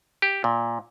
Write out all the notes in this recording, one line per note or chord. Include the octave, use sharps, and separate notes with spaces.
G4
A#2